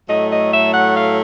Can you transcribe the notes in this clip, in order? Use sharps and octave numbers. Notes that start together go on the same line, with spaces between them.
A2 F#3 A3 D#5
D#5
E5
F#5
F5